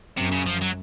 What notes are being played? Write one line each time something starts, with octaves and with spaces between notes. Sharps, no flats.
F#2 C3
C#3
F3
F#3